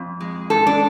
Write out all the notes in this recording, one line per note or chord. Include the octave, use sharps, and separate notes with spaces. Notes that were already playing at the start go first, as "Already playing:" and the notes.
Already playing: F2
G#3
G#2 A4
D4